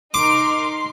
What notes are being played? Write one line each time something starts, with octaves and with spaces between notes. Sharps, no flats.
D#4 A#4 C6 D6